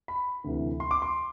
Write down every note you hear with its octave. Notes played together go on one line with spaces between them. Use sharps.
B5
D2 C3 E3
C6
D6
C6